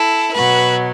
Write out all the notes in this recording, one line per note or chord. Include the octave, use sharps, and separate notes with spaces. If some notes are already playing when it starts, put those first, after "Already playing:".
Already playing: E4 A4
B2 F#3 F#4 B4